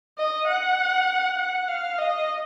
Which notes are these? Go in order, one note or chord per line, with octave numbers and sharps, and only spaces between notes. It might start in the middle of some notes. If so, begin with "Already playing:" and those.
D#5
F#5
F#5
F5
D#5